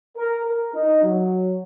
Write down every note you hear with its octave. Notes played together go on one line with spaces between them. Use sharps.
A#4
A#4
D#4
F#3